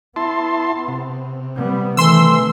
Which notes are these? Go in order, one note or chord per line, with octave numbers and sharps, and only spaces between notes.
B3 E4 A5 C6
C3
G3 B3
D#3 E3 A3 C6 E6